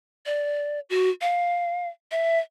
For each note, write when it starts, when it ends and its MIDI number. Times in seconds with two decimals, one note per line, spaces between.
0.26 0.80 74
0.90 1.10 66
1.21 1.88 77
2.11 2.39 76